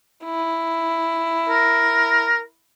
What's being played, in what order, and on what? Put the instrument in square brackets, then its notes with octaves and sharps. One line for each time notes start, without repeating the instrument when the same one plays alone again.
[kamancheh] E4
[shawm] A#4